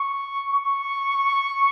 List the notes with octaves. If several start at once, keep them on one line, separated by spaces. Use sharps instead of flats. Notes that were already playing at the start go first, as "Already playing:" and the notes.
Already playing: C#6
C#6